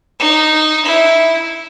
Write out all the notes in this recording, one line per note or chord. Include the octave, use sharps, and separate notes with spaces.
D#4
E4